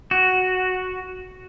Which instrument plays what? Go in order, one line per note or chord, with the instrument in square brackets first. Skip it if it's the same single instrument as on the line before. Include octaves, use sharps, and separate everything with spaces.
[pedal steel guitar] F#4